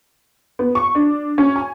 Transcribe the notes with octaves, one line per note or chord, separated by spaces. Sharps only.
B3
C#6
D4
C#4
G#5